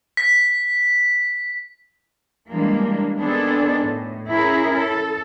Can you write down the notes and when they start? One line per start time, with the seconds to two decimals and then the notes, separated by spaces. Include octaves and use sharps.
0.17 B6
2.49 E3 G3 G#3 A#3 D4
3.17 D#3 B3 C4 D4 G#4 A4
3.83 A2
4.27 C#4 E4 G#4 A#4
4.76 A4